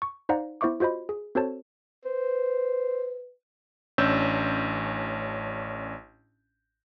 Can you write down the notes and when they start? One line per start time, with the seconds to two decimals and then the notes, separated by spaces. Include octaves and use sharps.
0.02 C#6
0.29 D#4 C5 D5 F5 F#5 A#5
0.61 B3 E4 C5 E5 C#6 D6
0.80 F4 F#4 C5 D#5 B5
1.09 G#4
1.35 C4 F#4 A4 C5 C#5 A5
2.05 B4 C5
3.98 A1 C#4 D4 E6 G6 E7